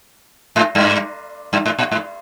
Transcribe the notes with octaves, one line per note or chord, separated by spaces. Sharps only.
G#2
G2
G2
G#2
A#2
G#2